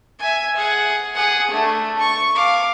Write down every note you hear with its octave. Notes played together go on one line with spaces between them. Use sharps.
E5 G#5
G#4 F#5
G#4 F#5
A3 D4
C#6
F5 D6